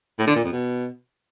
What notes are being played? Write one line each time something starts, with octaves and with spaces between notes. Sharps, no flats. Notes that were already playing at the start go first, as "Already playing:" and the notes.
A2
D3
A#2
F2
B2